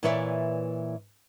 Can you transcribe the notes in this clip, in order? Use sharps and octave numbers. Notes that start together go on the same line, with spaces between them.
A#2 E3 B4 C#5 D5 E5